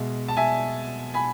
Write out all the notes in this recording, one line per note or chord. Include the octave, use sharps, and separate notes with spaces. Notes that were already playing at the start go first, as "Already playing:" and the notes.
Already playing: B2 G#3 E5
A5
E5 G#5
G#5 B5